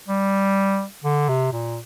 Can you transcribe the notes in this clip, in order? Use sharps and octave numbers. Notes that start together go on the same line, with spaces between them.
G3
D3
C3
A#2